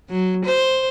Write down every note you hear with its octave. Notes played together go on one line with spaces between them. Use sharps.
F#3
C5